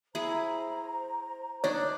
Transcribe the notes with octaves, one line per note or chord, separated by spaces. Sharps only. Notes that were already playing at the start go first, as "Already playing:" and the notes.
E4 G#4 C5 A#5
D4 D#4 C#5